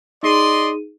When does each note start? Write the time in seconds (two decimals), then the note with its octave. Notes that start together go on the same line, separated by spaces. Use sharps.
0.23 D#4 G#4 D5 D#5 C6 D#7